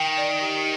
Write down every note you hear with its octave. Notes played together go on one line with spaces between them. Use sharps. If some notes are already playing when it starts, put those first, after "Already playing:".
Already playing: D#3 G5
D5
G4